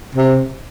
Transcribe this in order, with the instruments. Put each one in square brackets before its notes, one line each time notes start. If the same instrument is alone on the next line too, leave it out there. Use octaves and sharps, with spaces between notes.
[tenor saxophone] C3